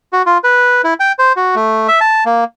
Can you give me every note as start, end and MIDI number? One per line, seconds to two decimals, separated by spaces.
0.13 0.22 66
0.26 0.38 65
0.44 0.82 71
0.84 0.94 64
1.00 1.12 79
1.19 1.33 72
1.36 1.55 66
1.55 1.88 57
1.88 2.00 76
2.01 2.24 81
2.25 2.44 58